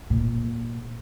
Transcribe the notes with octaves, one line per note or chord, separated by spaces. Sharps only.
A#2